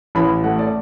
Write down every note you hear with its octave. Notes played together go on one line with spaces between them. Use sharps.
A1 B5
A3 F#5
D5